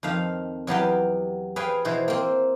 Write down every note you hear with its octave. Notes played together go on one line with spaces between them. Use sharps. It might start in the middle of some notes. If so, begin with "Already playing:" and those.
F2 D#3 F5
E2 F#3 B3 G4 F5 G5
G#4 B4 C#5 F5 G5 G#5
B2 E3 C5
A#3 C4